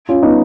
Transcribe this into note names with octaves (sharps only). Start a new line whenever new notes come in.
C#4 F4
B3 D#4